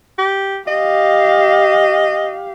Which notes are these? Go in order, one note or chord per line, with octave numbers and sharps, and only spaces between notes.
G4
G4 D#5 F5